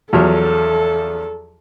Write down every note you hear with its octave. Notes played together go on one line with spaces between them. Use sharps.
E2 F3 F#3 A4